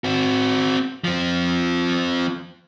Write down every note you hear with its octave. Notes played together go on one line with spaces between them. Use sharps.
C4 F#4
F3 C4